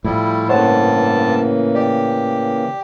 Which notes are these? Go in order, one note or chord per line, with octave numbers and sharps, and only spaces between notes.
A2 F3 G3 E4
G2 C#3 E3 A#3 C5 C#5 F#5 A5
G4 D5